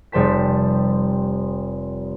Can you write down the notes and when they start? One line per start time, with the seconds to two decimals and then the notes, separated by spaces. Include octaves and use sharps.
0.12 F1 G3 C5 A5 B6